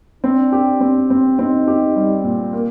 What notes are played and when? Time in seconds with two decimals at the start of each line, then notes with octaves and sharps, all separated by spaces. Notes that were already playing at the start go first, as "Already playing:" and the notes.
0.24 C4 D4
0.52 G4
0.80 C4
1.10 C4
1.39 C4 D#4
1.67 G4
1.96 G3
2.24 A#2
2.53 A#3